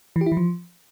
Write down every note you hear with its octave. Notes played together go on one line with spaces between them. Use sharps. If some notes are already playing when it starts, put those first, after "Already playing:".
E3
G4
E4
E3
F3